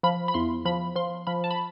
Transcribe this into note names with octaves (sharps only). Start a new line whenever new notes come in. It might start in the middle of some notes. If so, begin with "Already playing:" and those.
F3 B5
B5
E2 C6
F3 B5
F3 C6
F3 B5
A5
B5